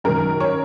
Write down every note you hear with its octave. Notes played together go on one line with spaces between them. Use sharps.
F#2 D#3 A#4
C#5